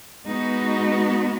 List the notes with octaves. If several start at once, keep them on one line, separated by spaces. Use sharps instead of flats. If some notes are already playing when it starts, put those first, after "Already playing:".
G#3 B3 D#4 F#4